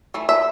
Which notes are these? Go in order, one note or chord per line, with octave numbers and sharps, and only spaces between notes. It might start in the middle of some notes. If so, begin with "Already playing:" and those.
E3 A3
E5